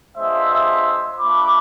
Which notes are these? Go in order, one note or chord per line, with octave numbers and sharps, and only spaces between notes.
G#3 B3 D4 F4 C5 E5
A3 D4 F4 B5 D6